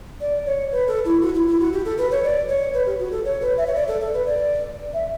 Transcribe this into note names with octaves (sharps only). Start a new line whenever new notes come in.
D5
C#5
B4
A4
E4
F#4
E4
E4
F#4
G4
A4
B4
C#5
D5
C#5
B4
G4
F#4
A4
C#5
B4
E5
C#5
D5
A4
A4
B4
D5
E5